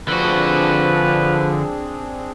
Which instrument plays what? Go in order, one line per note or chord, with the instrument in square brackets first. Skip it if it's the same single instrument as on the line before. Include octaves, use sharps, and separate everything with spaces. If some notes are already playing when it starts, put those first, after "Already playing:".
[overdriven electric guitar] D3 F#4 [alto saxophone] F3 [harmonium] C4 D4 G#4 [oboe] B4